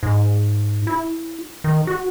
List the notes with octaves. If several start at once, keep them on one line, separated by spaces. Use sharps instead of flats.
G#2
E4
D#3
F#4